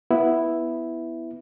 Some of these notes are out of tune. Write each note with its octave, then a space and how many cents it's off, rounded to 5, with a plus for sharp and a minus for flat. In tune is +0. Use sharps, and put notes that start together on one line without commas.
B3 +0 E4 +0